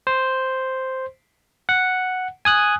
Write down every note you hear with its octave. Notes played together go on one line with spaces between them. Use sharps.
C5
F#5
G#5 D#6 F#6